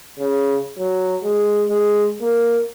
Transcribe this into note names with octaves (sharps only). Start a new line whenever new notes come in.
C#3
F#3
G#3
G#3
A#3